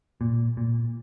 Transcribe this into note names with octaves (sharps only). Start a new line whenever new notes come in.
A#2
A#2